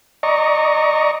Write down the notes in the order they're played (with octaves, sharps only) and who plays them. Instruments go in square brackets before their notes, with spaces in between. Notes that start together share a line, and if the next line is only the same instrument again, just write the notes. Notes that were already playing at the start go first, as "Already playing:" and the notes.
[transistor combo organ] D5 D#5 A#5 C#6